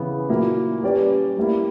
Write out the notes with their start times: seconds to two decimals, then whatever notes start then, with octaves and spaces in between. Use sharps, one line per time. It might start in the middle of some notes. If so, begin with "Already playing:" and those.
Already playing: C#3 E3 B3
0.29 A#2 F#3 A#3 E4
0.82 G3 C#4 G4 B4 D5
1.37 G3 A#3 E4